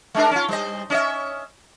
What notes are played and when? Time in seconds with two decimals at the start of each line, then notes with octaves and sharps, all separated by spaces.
0.15 G#3 D4 A#4
0.31 C#4 F4
0.48 G3 C5 D#5
0.90 C#4 D#5 E5